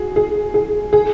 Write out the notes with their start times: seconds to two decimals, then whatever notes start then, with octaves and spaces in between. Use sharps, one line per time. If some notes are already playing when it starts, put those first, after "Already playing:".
Already playing: F#4 G#4
0.16 G#4
0.54 G#4
0.93 G#4